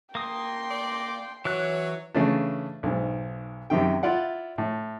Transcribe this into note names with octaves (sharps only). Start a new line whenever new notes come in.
A#3 G5 C6 D#6
D5
E3 F#3 C#5 F#6
C#3 E3 A3 C#4 D4
B1 G#2
F#2 C3 D#3 G5
E4 F4 D5 F#5
A2